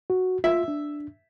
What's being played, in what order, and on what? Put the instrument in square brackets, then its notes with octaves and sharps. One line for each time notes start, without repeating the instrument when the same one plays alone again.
[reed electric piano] F#4
[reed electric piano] F4 [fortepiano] E5
[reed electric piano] D4